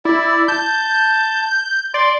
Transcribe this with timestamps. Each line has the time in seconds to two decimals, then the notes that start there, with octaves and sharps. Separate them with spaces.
0.05 E4 D5
0.48 A5 G6
1.94 D5 C6